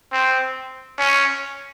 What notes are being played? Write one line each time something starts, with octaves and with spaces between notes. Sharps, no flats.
C4
C#4